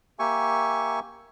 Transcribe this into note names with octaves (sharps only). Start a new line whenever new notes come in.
A#3 G4 E5 G#5 C#6